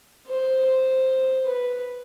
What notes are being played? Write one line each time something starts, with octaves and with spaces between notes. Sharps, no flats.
C5
C5
B4